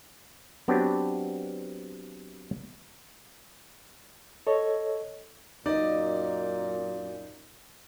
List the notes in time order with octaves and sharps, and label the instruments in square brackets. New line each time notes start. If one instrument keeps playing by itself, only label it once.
[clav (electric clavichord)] F#3 B3 C4 D4 G4 B4
[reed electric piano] A4 C#5 D#5
[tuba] F#2 [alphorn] A#2 [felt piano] D#4 [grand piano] D5 D#5